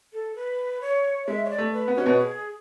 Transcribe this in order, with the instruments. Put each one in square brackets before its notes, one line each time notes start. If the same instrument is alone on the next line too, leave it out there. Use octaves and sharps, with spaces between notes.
[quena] A4
B4
C#5
[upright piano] G#3 [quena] E5
[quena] C#5
D5
[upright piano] A3
[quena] B4
[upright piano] B3
[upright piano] C#4 [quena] F#4
[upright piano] B2 B3
[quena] G#4